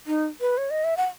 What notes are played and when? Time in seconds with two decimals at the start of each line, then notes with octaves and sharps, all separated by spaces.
0.07 D#4
0.41 B4
0.58 C#5
0.70 D#5
0.84 E5
0.97 F#5